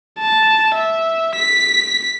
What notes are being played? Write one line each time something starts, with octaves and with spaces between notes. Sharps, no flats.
A5
E5
B6